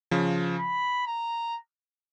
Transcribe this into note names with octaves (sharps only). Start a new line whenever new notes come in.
C#3 F3
B5
A#5